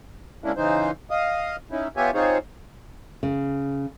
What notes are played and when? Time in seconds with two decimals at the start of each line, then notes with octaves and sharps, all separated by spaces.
0.44 C#3 G#3 A#3 C#4 D4 E4
0.57 C#3 E3 D#4 C5
1.11 D#5 F5 D#6
1.71 C#4 D#4 E4
1.97 B3 F4 G4 C#5 E5 G#5
2.14 C4 D#4 F4 G#4 C5 C#5
3.23 C#3